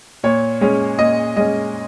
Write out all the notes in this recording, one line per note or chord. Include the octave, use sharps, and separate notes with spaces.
A#2 C#5
G#3 C#4
A#2 D#5
G#3 C#4 D#5